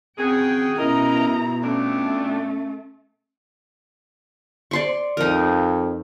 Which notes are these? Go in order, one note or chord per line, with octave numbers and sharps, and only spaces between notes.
C#3 C4 F#4 G#4 G5
B2 C#4 E4 A#4 D#5 A#5
F2 A3 C#4 D4
D5 C6 C#6
F2 D#4 A#4